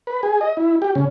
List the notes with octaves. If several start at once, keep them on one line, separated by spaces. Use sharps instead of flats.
B4
G#4
D#5
E4
G4
C#3